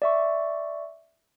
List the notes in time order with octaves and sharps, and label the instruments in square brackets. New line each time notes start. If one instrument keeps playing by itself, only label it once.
[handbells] D5 E5 C#6